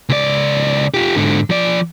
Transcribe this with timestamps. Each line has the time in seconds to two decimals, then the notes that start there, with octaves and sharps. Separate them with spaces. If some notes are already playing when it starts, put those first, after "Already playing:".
0.09 C#2 D5
0.94 F4 G4
1.16 G#2 D3
1.50 F3 D5